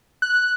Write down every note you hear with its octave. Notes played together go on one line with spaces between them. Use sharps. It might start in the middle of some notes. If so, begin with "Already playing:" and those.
F#6